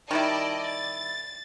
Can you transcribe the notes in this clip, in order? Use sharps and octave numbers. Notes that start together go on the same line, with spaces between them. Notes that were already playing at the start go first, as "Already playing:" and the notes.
D#3 G3 E4 D5 D#5 A5
A6